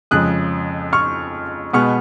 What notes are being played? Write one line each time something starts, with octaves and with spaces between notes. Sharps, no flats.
F2 C#3 G#3 D#6 F#6
C#6 F6
B2 G#3 B3 C#6 F6